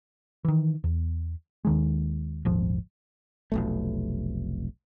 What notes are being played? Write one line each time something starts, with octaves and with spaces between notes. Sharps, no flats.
D#3 E3
E2
D#2 D#3 G#3
D#1 G#1 F3
F1 B1 A3